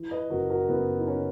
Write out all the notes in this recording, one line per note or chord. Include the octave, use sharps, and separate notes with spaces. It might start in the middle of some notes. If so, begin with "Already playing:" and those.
Already playing: E3
B4 D#5
F#1 F#4 A#4
F#4 A#4
F#1 B3
D#4
C#4